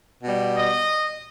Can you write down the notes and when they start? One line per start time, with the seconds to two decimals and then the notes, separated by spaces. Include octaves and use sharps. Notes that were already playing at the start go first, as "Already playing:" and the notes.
0.23 B2 G3
0.55 D#5